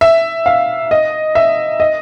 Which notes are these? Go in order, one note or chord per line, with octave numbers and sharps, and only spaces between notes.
E5
F5
D#5
E5
D#5